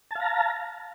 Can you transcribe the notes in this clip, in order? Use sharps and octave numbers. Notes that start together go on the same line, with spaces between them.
F5 A5 A#5